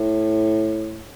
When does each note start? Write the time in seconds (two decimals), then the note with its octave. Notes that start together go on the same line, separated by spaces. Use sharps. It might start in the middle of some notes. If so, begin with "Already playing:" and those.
Already playing: A2